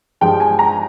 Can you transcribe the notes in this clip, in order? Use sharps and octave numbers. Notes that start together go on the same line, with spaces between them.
G2 F3 G#3 G5
G#5
A#5